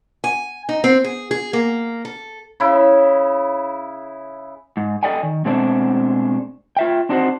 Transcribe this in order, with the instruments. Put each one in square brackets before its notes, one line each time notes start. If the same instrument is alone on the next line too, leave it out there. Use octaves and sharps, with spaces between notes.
[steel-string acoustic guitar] G#5
D#4
C4
G#4
G#4
A#3
A4
[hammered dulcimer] C#3 E4
[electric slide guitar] G#2
A4 B4 D5 D#5 G5 G#5
D#3
B2 G#3 A3 C4 D4
F4 E5 G5
C4 D4 D#4 F#4 B4 C5